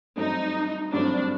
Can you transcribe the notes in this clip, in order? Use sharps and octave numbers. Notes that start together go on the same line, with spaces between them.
G2 F#3 A3 C4 D#4
G2 F#3 A3 C4 D4